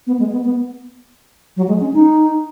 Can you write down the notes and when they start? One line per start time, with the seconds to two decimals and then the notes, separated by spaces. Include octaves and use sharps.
0.07 B3
0.19 G#3
0.32 B3
0.45 B3
1.57 F#3
1.68 G#3
1.81 C#4
1.94 D#4